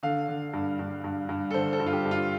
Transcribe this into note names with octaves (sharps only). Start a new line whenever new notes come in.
D3 F5
D3
G2
G2
G2
G2
A4
D3 C5
A4
G2
F4
G4
G2
F4